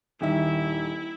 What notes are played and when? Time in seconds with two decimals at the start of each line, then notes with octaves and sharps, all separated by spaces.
0.21 D#1 D#3 E4 E5